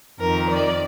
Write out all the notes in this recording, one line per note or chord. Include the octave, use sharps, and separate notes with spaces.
F2 D#3 A#4
D5